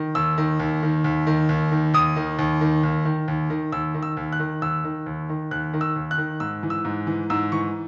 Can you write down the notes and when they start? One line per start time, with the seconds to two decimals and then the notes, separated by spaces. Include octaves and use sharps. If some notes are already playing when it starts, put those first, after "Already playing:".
Already playing: D#3
0.15 D#2 E6
0.38 D#3
0.60 D#2
0.83 D#3
1.04 D#2
1.27 D#3
1.49 D#2
1.71 D#3
1.94 D#2 D#6
2.16 D#3
2.39 D#2
2.61 D#3
2.83 D#2
3.05 D#3
3.28 D#2
3.50 D#3
3.72 D#2 E6
3.94 D#3
4.03 E6
4.17 D#2
4.32 F#6
4.39 D#3
4.62 D#2 E6
4.84 D#3
5.06 D#2
5.29 D#3
5.51 D#2 F#6
5.74 D#3
5.81 E6
5.96 D#2
6.11 F#6
6.18 D#3
6.40 G#2 E6
6.63 E3
6.70 E6
6.85 G#2
7.07 E3
7.30 G#2 E6
7.52 E3 C#6